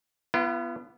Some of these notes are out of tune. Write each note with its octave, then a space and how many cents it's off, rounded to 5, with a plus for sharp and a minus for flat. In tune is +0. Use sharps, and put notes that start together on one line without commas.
B3 +0 F4 -45 B4 -20